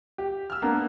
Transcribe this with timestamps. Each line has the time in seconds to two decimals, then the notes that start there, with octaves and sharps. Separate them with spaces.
0.18 G4
0.50 E6 F6
0.62 A#3 B3 D4 A#4